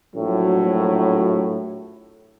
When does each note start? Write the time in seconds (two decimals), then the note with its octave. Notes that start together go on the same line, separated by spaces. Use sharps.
0.16 A#1 A2 F#3